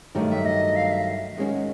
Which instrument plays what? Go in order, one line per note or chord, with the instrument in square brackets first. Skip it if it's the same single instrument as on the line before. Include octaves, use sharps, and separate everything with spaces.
[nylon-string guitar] G2 D#3 F#3 A3
[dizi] E5
D#5
F5
E5
[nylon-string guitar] D#3 G#3 C#4 F#4